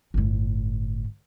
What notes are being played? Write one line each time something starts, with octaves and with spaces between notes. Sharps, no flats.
G1 A2